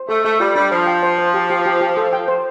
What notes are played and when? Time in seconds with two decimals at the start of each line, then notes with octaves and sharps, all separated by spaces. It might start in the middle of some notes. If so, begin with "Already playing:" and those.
Already playing: C5
0.09 A3 A4
0.25 A3 A4
0.40 G3 F4
0.55 G3 D4
0.71 F3 C5
0.87 G5
1.03 C5
1.18 C5
1.34 G4
1.50 G4
1.66 G4
1.81 G4
1.97 A4
2.13 G5
2.28 C5